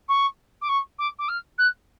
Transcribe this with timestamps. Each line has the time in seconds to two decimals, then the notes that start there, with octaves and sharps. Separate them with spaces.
0.09 C#6
0.62 D6
0.69 C#6
0.99 D6
1.19 D6
1.29 F6
1.58 F#6